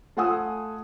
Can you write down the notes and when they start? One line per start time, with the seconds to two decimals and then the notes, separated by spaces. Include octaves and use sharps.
0.17 A3 F4 F#5 G#5 D#6 E6